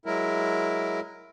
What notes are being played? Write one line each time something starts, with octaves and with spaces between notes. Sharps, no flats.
F#3 G#3 E4 A#4